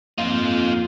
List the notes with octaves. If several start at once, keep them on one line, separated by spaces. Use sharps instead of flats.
F2 A#3 D#4 F4 C5